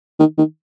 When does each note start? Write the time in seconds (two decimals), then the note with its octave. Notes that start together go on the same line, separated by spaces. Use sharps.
0.20 D#3
0.38 D#3